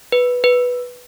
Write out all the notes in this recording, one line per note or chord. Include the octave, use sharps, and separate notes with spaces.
B4
B4